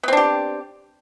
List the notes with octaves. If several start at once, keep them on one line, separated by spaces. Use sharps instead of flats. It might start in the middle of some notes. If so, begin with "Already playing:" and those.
B3 C4 D4 G4